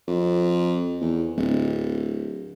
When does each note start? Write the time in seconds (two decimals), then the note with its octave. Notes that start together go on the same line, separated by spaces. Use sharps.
0.08 F2
1.01 E2
1.37 D1